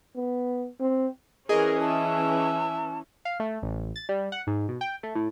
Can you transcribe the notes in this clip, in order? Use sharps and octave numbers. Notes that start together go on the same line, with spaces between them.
B3
C4
E3 C#4 G#4 A#4 D#5
E4 E5 A5
F5
A3
A1
A6
G3
F#5
G#2
B2
G5
A3
A2